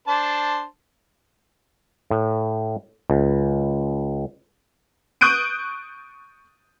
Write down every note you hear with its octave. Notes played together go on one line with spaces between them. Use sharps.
D4 C5 A5
A2
C#2
C#6 D#6 F#6 G6 D7 D#7